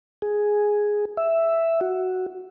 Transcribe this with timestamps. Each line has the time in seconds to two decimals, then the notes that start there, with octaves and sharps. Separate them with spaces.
0.22 G#4
1.17 E5
1.81 F#4